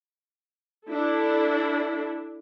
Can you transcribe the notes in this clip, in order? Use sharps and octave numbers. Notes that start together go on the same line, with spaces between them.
D4 E4 A4